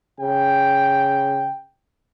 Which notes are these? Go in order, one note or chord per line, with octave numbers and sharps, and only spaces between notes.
C#3 G5